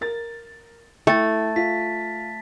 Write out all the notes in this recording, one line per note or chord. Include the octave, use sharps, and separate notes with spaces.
A#4 A6
A3 E4 A4 G5 A5 A6
F4 B6